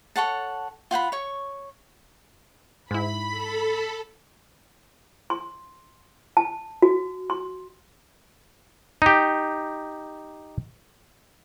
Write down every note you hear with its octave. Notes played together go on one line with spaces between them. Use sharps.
A4 C#5 F#5 A5
F4 F#5 G5 B5
C#5 C#6
G#2 E4 B5
A4
C6
A5
F#4
C6
D#4 G4